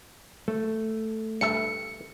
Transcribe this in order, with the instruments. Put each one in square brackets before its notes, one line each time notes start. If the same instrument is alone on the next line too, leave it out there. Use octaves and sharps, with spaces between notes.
[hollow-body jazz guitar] A3
[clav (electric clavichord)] G2 A4 E5 [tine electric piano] C#7